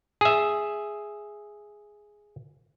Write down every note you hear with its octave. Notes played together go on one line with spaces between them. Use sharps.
G#4 E5